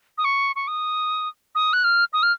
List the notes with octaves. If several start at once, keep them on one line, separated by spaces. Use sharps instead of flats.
D#6
C#6
C#6
D#6
D#6
F#6
F6
D#6
F6